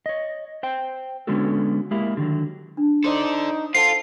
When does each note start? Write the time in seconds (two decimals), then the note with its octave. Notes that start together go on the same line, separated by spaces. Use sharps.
0.06 C#5 D#5
0.63 C5 G5
1.27 D3 G#3 B3 C#4 F#4 A4
1.91 G#3 A#3 E4 G4
2.17 D3 D#3 F#3
2.77 D4
3.04 D#4 A4 C5 D5 C6
3.75 F4 A4 C5 F#5 A5 C7